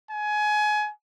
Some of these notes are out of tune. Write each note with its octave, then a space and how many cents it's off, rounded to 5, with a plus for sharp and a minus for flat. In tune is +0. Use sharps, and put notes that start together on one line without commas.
G#5 +25